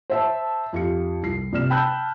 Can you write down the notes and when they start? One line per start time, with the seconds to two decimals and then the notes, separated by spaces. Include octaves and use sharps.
0.10 C5 E5 A5
0.73 F2 F4 G4 C#7
1.23 C2 C7
1.53 C3 D5 F6 E7
1.70 G5 A5 B5 E6 F#6 G6